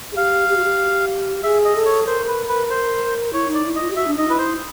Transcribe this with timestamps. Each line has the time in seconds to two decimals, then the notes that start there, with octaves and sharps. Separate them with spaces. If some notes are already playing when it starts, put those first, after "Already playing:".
0.12 G#4
0.17 G4 F5
0.49 G4
0.57 F#4
0.64 G4
1.43 G#4 E5
1.65 D#5
1.75 A4
1.85 C#5
2.07 A#4 C5
2.28 B4
2.48 B4
2.70 C5
3.33 E4 C#5
3.48 D#4
3.54 D5
3.65 E4
3.76 D#5
3.81 F4
3.90 G4
3.96 F#4 E5
4.07 D4
4.17 D#4 D#5
4.28 E4 B4
4.38 C5